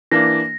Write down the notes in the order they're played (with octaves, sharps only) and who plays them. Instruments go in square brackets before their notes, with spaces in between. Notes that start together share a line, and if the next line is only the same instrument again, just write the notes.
[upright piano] E3 A#3 D4 [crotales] A#6